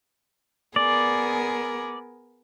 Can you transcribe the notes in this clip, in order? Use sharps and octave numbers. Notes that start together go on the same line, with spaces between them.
B3 G#4 A#4 D5